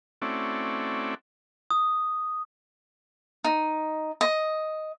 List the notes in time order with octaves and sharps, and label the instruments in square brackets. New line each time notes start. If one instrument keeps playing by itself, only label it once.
[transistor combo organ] A3 C4 C#4 E4 F#4 D5
[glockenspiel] D#6
[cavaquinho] D#4
D#5